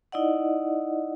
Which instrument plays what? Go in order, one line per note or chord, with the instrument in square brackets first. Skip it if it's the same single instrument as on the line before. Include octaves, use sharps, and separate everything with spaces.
[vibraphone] D#4 E4 D5 D#5 F#5